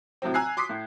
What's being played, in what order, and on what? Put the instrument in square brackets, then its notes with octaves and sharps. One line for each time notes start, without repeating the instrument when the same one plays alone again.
[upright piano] A2 C3 F#3 C4
G#5 A#5 E6 F#6 G#6 C7
C6 D6 D#6 B6 C7
A2